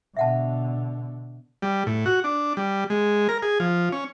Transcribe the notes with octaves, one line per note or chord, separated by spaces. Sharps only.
B2 D3 E5 F#5 A5
G3
A2
F#4
D4
G3
G#3
A#4
G#4
F3
C#4